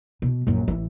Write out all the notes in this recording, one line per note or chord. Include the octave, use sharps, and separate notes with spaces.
B2
A#1 F#2
A1 E3